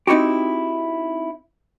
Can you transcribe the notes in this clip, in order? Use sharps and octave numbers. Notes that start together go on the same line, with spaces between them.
C4 D#4 E4 F#4 G4